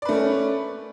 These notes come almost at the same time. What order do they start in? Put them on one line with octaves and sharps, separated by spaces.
D5 B4 A3 C#4